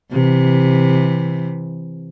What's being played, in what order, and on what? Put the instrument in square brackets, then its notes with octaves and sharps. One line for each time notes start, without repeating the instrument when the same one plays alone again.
[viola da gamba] C3 E3